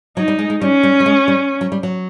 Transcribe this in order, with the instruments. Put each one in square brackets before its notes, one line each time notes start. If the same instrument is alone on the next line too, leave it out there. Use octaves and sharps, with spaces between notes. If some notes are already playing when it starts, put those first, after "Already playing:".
[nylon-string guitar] F#3 [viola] D#4
[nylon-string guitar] G3
G#3
G#3
[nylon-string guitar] G3 [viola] C#4
[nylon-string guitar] G3
G3
G#3
G3
F#3
G3
F#3